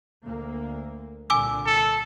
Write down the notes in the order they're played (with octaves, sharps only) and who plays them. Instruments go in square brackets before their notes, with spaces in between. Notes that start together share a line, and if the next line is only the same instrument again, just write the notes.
[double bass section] D2 A#3
[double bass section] C2 A#2 D3 [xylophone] G#5 D6 E6
[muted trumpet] A4